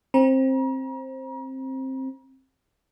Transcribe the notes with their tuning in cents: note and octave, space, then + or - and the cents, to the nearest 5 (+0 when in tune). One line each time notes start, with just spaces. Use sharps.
C4 +15 A#5 +40